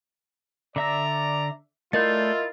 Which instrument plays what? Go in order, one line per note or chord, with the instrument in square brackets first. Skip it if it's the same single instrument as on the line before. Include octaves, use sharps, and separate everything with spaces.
[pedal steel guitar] D3 E5 E6 [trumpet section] D5 A#5
[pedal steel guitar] A3 D5 G6 [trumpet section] E4 F4 [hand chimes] A#4 D#5 A6